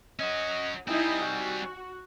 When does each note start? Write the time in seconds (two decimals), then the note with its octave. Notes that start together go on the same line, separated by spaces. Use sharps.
0.20 C#4 F#4 D#5
0.88 G3 C4 D#4 E4 D#5 G#5
1.24 F#4